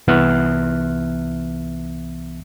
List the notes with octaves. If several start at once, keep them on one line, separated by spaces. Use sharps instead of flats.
C2 E3 B3 E5 F6 F#6